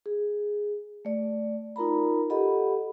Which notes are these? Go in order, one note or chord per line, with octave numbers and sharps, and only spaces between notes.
G#4
A3 D5
D#4 F4 A#4 A#5 B5
G4 A4 D#5 F#5 B5